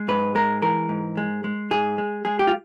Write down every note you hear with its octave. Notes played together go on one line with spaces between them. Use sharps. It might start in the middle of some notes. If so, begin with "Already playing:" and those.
Already playing: G#3
G#2 B4
G#3 A#4
E3 A#4
G#2
G#3
G#3
G#2 G#4
G#3
G#3 G#4
G4
F4